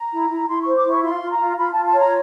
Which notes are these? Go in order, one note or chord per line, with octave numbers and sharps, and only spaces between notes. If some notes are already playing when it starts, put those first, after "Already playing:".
Already playing: A#5
E4
E4
E4 C6
C5 C#6
D6
E4 C#6
F4 C6
F4
A#5
F4
F4 B5
A5
F4
A5
C#5
A#5